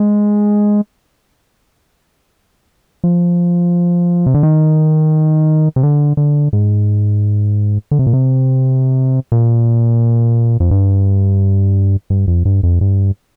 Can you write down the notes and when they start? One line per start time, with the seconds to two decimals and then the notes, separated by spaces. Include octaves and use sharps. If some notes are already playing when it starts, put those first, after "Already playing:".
Already playing: G#3
3.04 F3
4.26 C3
4.34 D3
4.43 D#3
5.76 C3
5.83 D3
6.17 D3
6.53 G#2
7.91 D3
7.99 C3
8.07 A#2
8.13 C3
9.32 A#2
10.60 F2
10.71 G2
12.10 G2
12.27 F2
12.45 G2
12.63 F2
12.81 G2